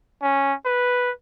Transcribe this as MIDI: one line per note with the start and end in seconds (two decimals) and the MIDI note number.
0.22 0.54 61
0.65 1.11 71